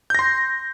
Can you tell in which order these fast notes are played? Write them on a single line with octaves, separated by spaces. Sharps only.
G6 A#6 C6